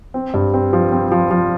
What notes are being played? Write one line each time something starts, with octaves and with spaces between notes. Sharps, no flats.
C4
G2
C4
F3
C4
F3
F3